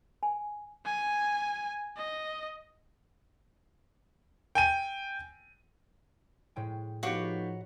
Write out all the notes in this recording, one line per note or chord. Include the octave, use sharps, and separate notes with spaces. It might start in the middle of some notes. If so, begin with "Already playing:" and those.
G#5
G#5
D#5
G5 G#5 D#7
A2 G#3 G5
F3 A3 B3 D#4 F#4 G4 C#5 F5